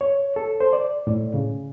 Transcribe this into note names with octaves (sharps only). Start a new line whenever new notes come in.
C#5
A4
C5
D5
A2
C#3